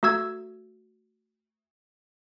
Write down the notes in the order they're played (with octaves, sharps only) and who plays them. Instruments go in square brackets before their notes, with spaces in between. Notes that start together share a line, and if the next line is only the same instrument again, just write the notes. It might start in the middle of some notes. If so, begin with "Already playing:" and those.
[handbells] A3 F#4 E6 G#6